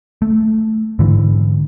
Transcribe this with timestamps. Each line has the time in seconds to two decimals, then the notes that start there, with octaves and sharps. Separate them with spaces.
0.22 A3
0.99 G#2 D3 E3